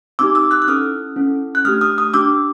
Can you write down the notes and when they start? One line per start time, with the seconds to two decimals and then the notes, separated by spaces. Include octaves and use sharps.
0.19 C4 D#4 G4 D6 E6
0.35 D6 E6
0.51 E6 F#6
0.62 F#6
0.68 C#4 E4 A4 D#6 F6
1.16 C#4 E4 A4
1.55 F#6
1.65 A3 D4 G4 D#6 F6
1.81 D#6 F6
1.98 D#6 F6
2.13 D4 G4 D6 E6